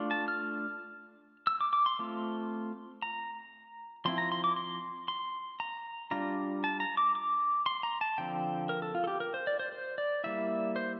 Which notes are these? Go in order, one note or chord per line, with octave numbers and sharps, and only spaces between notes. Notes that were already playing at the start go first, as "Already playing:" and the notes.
Already playing: A3 D4 F4
A5
F6
E6
D6
D6
C6
A3 C4 F4
A#5
F3 C4 E4 C6
A#5
C6
D6
C6
C6
A#5
G3 D4 F4 A#5
A5
A#5
D6
D6
C6
A#5
A5
D3 F3 C4 G5
A#4
A4
F4
A4
G4
A#4
C5
D5
C5
C5
D5
G3 A#3 E4 E5
C5